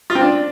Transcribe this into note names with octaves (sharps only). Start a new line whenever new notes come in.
F4
C4
D4